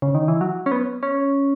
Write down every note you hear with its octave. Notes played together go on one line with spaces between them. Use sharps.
C#3
D#3
E3
F#3
C#4
B3
C#4